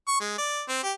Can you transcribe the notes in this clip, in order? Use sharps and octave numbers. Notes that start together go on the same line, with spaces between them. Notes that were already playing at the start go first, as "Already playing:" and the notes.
C#6
G#3
D5
C4
G4